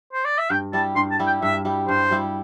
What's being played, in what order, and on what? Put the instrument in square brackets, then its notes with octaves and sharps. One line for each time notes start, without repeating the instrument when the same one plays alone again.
[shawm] C5
D5
E5
[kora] G2 [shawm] G5
[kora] G3 E4 G4 [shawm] A5
[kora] G2 [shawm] C6
[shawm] A5
[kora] G3 E4 G4
[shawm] G5
[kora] G2 [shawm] E5
[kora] G3 E4 G4
[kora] G2 [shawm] C5
[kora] G3 E4 G4